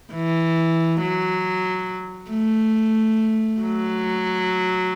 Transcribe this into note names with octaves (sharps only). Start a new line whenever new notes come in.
E3
F#3
A3
F#3